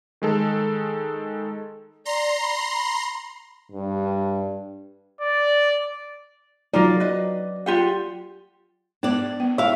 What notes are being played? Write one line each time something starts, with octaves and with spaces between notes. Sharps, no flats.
D#3 G#3 A4
D5 A#5 C6
B5
G2
D5
F#3 D#4 F4 A#4 D5
B4 D#5
F4 G4 F#5
B3 D4 D5
B3
E4 E5 F5